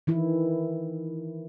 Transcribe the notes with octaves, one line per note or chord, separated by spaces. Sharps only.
D#3 E3 E4